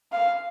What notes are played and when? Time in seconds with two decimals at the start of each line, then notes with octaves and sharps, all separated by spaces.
0.12 F5